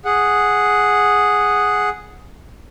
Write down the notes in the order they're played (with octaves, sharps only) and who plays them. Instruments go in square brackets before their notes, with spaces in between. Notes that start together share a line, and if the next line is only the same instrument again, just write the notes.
[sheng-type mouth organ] G#4 F#5